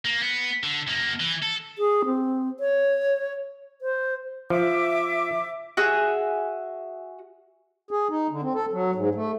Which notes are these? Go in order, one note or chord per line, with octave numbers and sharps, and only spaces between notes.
A#3
B3
D3
F#2 A#3
E3
A4
G#4
C4
C#5
C5
F3 E5 D6
F#4 G#4 E5
G#4
D#4
D3
C4
A4
F#3
G#2
A3